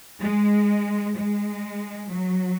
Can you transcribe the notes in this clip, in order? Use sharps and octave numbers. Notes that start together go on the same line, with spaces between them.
G#3
G#3
F#3